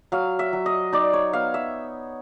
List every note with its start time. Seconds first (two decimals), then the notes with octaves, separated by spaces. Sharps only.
0.12 F#3 F5
0.39 E5
0.53 F#3
0.66 D#5
0.93 D#4 D5
1.13 C#5
1.33 B3 F5
1.54 E5